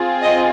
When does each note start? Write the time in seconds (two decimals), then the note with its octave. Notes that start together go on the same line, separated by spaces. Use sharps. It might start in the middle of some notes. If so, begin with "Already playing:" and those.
Already playing: C4 F4 G#4
0.21 D#5